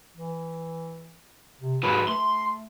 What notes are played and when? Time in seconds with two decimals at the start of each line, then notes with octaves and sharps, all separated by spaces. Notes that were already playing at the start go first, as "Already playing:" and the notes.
0.15 E3
1.61 C3
1.83 G#2 F#3 B4
2.08 A3 C6